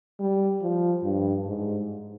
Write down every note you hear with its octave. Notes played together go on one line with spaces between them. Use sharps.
G3
F3
G2
G#2